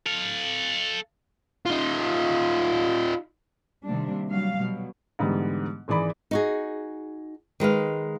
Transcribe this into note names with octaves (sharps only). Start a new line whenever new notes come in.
A4 F5
D#4 F4
C3 D#3 G3 A#3 D4
F#3 G3 F5
B2 F#3
G#2 D3 E3 G3 B3
G#1 E3 G#4 D5 B5
D#4 F#4 G#4
D#3 G#3 B4 F5